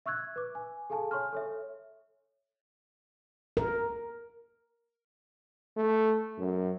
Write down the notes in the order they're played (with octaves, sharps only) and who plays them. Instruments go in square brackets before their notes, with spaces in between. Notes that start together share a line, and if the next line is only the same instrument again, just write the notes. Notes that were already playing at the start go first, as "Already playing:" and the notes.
[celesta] E5 C#6 E6 F#6 G#6
B4 D6
G#5
G#4 A4 F5 G#5 A5
C#5 G#5 C6 C#6 F6
A4 C#5 E5
[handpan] A#4
[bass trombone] A3
F#2